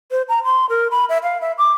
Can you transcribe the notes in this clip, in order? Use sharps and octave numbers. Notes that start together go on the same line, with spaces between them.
C5
A#5
C6
A#4
B5
E5
F5
E5
D6